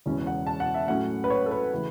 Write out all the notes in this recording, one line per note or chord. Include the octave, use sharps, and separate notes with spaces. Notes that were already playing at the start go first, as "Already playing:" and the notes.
E1 E2 C#3 E3 C#4
F#5
A5
F#5
E5
A2 F#3 A3 C#4 F#5
B4
C#5
A4
B4
C#3 E3 A3